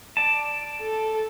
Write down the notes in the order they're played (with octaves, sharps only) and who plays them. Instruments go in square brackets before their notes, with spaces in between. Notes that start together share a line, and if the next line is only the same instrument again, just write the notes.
[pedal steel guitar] D5 A5
[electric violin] A4